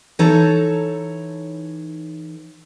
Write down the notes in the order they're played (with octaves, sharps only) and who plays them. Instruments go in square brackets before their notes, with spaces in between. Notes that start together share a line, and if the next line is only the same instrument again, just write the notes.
[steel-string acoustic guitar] E3 D#4 A4 C#5 A#5